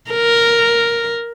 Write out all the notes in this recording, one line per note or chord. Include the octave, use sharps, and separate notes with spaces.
A#4